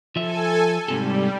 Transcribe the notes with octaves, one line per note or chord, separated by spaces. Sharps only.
F3 A4 E5 G#5
G#2 C3 G3 A4